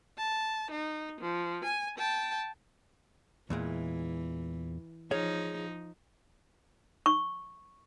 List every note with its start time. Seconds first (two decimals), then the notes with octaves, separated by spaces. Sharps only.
0.17 A5
0.71 D#4
1.21 F3
1.64 G#5
1.98 G5 A5
3.50 E2 A#2 E3 G#3
5.11 F3 D#4 G#4 C#5 F5
7.06 C#6